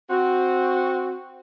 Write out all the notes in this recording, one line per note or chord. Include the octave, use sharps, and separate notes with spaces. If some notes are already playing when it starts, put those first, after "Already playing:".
C4 F#4